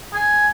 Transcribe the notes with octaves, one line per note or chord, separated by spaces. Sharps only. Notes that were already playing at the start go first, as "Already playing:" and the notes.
G#5